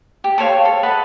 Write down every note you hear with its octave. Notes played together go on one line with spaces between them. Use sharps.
G4
A4 C5 C#5 F5
A4
B4 D#5 F#5 A5